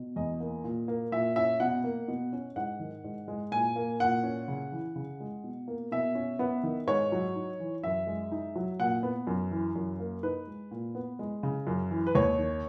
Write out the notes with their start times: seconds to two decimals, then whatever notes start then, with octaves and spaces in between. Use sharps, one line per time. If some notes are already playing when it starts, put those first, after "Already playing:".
Already playing: B2
0.16 E2 D#5
0.40 A#3
0.64 A#2
0.88 A#3
1.12 A#2 E5
1.36 C#4 E5
1.60 B2 F#5
1.84 A#3
2.08 B2
2.33 C#4
2.56 G#2 F#5
2.80 D#3
3.04 G#2
3.28 G#3
3.52 A#2 G#5
3.76 A#3
4.00 A#2 F#5
4.23 C#4
4.48 C#3
4.72 E3
4.96 C#3
5.20 G#3
5.44 B2
5.68 A#3
5.92 B2 E5
6.15 C#4
6.39 B3
6.63 D#3
6.87 G#2 C#5
7.12 F#3
7.35 D#4
7.60 E3
7.83 F#2 E5
8.07 G#3
8.32 D#4
8.55 F#3
8.80 A#2 F#5
9.03 B3
9.27 F#2
9.51 E3
9.75 F#2
9.99 A#3
10.23 D#4 B4
10.47 G#3
10.71 A#2
10.95 B3
11.19 G#3
11.43 C#3
11.67 F#2
11.91 E3
12.07 B4
12.15 D#2 C#5
12.39 D#3